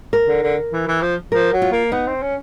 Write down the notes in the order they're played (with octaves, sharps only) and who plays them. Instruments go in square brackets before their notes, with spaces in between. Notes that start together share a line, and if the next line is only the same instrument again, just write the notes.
[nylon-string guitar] A#4
[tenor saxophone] D3
D3
E3
E3
F3
[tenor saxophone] F3 [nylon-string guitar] A#4
[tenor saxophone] F#3
[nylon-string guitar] F4
[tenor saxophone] A#3
[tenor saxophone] B3 [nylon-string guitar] D#4
[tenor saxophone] C4
C#4